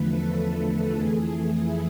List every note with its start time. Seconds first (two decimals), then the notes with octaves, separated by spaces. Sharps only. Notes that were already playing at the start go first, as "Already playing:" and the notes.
Already playing: E2 D3 F3 A3 B4
0.10 A4
0.38 A4
0.95 F2 E3 A3 G#4
1.52 E4